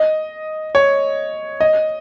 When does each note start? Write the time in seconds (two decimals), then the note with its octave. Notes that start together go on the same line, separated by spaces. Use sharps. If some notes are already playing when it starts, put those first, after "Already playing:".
Already playing: D#5
0.75 C#5
1.60 D#5